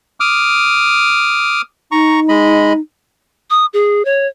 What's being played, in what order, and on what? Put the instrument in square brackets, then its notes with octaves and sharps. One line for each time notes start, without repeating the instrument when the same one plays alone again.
[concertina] D6 D#6 F6
[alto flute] D#4 [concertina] A#5 C#6
[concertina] G#3 D#5 B5
[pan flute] D#6
G#4
C#5